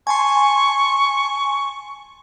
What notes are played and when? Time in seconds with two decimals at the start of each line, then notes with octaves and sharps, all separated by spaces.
0.07 G#5 A5 C6 C#6